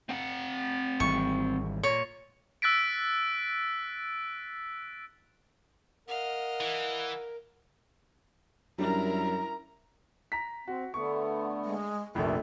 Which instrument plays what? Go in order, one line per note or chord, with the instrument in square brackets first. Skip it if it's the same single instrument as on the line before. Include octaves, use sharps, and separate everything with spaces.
[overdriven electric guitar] C4 F#5
[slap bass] G#1 E3 G3 [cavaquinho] C#6
[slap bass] A#2 [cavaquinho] C#5
[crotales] E6 F#6 A6 B6 D7
[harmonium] A#4 [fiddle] D#5 F5 [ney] F#5
[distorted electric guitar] E3
[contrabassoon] F#2 [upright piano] G3 D4 [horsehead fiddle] E4 A#4 [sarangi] A#5
[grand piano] A#5 B6
[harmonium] C4 [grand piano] F#4
[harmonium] D3 A3 B3 [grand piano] C#6
[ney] G#3
[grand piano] F1 A#1 [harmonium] G2 A3 A#3 [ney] A4